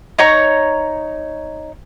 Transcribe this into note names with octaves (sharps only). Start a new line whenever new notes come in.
D#4 C#5 A#5 C#6